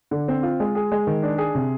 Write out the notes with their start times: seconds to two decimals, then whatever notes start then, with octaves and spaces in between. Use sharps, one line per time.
0.11 D3
0.28 C4
0.43 F4
0.60 G#3
0.75 G#4
0.92 G#3
1.07 D#3
1.23 D4
1.38 G#4
1.55 C3